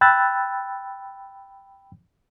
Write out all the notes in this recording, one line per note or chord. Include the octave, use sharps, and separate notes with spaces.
G5 B5 E6 F#6 A6